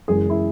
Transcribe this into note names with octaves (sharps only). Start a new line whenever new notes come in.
F#1 F#2 E3 G#3 G#4
E4